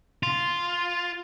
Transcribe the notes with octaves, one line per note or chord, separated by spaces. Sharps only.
F4